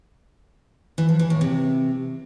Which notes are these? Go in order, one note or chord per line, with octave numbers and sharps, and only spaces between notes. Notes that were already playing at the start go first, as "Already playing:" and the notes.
E3
F3
E3
A2
C3